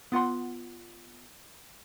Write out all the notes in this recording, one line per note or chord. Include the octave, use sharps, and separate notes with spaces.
B3 F4 F#5 C6